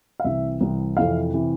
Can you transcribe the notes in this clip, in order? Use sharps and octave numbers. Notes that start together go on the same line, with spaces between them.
F5
C2 C3 E3 E5
C2 C3 E3
F2 C3 E3 F5
C3 E3